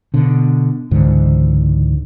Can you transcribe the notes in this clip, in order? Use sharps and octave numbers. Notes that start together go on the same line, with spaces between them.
B2 D3
C#2 G#2 D3 E3